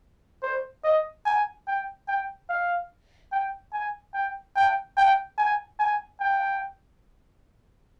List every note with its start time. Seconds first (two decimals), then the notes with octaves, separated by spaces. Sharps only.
0.43 C5
0.84 D#5
1.26 G#5
1.68 G5
2.08 G5
2.49 F5
3.32 G5
3.73 G#5
4.14 G5
4.56 G5
4.97 G5
5.38 G#5
5.79 G#5
6.20 G5